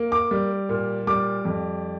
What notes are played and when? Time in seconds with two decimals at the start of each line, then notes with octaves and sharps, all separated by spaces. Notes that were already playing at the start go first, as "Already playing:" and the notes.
Already playing: A#3
0.12 D6
0.31 G3
0.69 A#2
1.07 G3 D6
1.45 F2